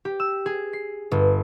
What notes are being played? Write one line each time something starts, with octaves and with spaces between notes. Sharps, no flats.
G4
E6
G#4
C7
G1